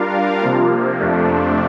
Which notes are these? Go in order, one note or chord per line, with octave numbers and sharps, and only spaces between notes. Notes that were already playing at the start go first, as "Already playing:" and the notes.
Already playing: G3 D4 F4 A#4 F5
C3 F3 A#3
F2 C3 F3 A3 D4